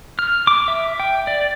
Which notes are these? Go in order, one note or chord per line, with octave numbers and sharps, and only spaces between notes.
F6
D6
E5
G5
D5